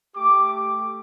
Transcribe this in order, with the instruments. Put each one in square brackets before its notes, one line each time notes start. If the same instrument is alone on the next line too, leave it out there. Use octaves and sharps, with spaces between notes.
[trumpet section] A3 G4 D6